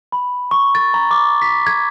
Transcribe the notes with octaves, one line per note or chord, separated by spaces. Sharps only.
B5
C#6
A6
A#5
D6
B6
G#6